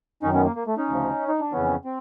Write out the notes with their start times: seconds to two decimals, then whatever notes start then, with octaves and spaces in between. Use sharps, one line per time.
0.23 F#2 D#3 C#4 D#4
0.34 B3 C#4
0.45 A#3
0.56 A#3
0.67 A3
0.77 C#4 D#4
0.88 D2 C#3 F3
1.28 D#4
1.40 D4
1.53 F2 C#3 E3 B3 C#4
1.85 C4